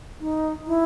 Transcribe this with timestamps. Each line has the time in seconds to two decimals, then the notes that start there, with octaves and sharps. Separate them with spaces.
0.21 D#4
0.67 E4